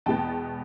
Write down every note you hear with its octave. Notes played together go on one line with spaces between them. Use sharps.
E2 B2 G#3 B3 G5 A5